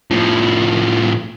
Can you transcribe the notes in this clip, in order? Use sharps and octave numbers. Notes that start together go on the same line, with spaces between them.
A2 F3